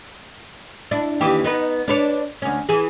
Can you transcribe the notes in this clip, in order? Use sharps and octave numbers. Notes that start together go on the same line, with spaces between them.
D4 E4
D#2 E3 G4
B3 D#4 B4
D4 B4 C#5
D2 C#4
E3 G#4